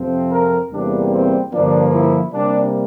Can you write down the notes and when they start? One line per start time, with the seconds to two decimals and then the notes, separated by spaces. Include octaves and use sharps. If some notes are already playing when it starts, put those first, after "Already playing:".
Already playing: F2 C3 F3 C4
0.31 A#4
0.71 E2 C3 G3 A#3 D4
1.11 C4
1.51 G2 D3 F3 A#3 D4
1.92 E4
2.32 C3 G3 A#3 D4